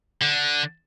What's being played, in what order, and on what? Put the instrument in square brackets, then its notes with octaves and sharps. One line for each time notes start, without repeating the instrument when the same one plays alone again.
[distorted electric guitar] D3